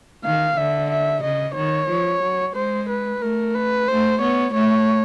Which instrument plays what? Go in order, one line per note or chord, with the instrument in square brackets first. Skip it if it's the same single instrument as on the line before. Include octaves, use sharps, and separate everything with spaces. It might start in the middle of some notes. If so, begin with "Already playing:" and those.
[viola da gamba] D#3 [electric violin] F5
[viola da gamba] D3 [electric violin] E5
[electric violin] E5
[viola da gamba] C#3 [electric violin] D#5
[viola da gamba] D#3 [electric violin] C#5
[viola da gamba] F3
F#3
[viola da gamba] G#3 [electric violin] C5
[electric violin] B4
[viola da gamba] A3 [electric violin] A#4
[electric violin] B4
[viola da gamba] A3 [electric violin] C5
[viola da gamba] B3 [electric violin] C#5
[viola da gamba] A3 [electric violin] C#5